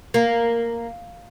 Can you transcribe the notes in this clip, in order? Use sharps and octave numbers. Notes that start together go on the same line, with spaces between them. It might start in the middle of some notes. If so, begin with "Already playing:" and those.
A#3